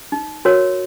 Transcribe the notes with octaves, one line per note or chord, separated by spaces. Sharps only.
D#4
F#4 A#4 C#5